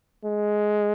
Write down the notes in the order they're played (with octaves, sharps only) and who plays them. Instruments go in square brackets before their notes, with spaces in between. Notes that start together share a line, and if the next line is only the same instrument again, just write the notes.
[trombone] G#3